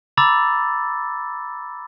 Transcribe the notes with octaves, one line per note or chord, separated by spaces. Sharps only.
A#5 B5 D6 E6 A6